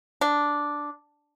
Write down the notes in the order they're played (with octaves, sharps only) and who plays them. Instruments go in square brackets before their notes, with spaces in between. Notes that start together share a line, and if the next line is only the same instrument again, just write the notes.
[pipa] D4